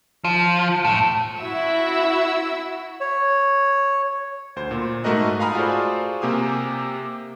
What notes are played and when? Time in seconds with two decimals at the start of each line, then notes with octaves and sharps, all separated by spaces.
0.24 F3
0.84 A2
1.38 E4 F#4 E5 E6
3.00 C#5
4.56 D2 C5
4.71 A#2
5.04 G#2 A3 F#4 A#4 D#5 F#6
5.40 F5 G#5 A#5 B5 D#6 F6
5.55 F4 F#4 G#4 A4 C5 D5
6.21 C3 A#3 G4 G#5 D#6